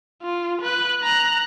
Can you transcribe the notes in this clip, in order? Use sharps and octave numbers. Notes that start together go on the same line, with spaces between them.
F4
B4 F#6
A#5 F#6